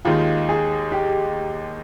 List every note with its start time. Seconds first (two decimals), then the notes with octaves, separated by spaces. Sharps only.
0.05 D#2 D#3 G#3 D#4 F4
0.49 G#4
0.92 G4